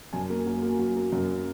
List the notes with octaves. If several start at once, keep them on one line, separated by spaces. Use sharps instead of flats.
F#2 G#5
A#3
F#3
A#3
F#3
A#3
F#2